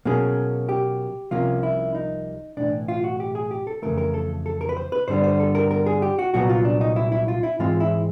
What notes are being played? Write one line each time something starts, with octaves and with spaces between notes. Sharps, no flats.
B2 F#3 A#3 C#4 G#4
G4
C2 C3 F3 A#3 C#4 F4
E4
D#4
B1 A2 E3 D4
F4
F#4
G4
G#4
G4
A4
F2 C#3 E3 A3 A#4
A#4
A4
A4
A#4
B4
C5
B4
G2 D3 G3 B3 C5
C5
A4
A#4
A#4
G#4
G4
F#4
C2 A#2 F#3 B3 F#4
F4
D4
D#4
E4
E4
F4
E4
G#2 E3 G#3 C4 F4
E4